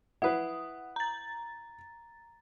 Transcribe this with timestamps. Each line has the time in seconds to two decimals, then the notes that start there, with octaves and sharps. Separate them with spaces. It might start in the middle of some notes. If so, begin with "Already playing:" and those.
0.22 E4 B4 F#5 D#6
0.96 A#5 A6